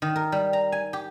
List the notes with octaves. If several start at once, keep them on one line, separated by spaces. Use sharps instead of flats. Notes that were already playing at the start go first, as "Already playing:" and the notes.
D#3
A#4
G3
A#5
G#5
G4